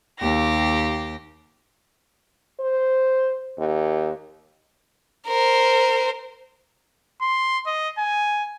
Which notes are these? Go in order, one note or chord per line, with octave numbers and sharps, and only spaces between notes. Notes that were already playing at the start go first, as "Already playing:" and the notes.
D#2 G4 A#6
C5
D#2
A#4 C5
C6
D#5
G#5